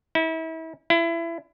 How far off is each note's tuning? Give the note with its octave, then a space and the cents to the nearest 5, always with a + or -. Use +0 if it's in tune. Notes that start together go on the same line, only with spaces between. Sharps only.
E4 -35
E4 +25